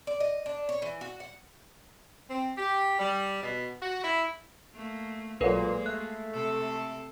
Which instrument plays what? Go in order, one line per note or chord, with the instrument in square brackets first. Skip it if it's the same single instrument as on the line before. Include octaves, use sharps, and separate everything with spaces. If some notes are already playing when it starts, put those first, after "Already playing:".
[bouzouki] D5
D#5
D4
C#5
E3
F#4
F#5
[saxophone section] C4
G4
G3
B2
F#4
E4
[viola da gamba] A3 A#3
[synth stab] B1 F#3 [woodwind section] A#2 [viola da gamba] G#3 A#3 [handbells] A4 B4
[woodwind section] A3 [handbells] F#6
[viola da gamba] C3 A4